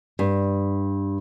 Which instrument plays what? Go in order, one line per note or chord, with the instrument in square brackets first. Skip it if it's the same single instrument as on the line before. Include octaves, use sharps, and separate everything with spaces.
[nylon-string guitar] G2